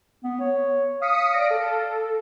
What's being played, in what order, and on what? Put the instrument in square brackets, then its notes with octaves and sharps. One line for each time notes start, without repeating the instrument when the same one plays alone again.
[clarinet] B3
C#5
[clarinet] F5 [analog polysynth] D#6 B6 C#7
[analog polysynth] D5 A#6 D7
A4